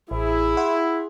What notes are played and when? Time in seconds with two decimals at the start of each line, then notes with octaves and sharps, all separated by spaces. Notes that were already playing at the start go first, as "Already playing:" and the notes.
0.11 A1 E4 G#4
0.57 E5 F#5 C6